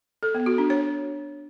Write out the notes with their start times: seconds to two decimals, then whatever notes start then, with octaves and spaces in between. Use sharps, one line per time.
0.23 A4
0.34 B3
0.46 F#4
0.58 D4
0.70 C#5